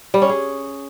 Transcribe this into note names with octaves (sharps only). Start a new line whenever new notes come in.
G3
C#4
G#4